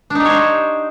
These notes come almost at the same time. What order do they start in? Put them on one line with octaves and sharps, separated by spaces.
D4 D#4 G4 C#5 C5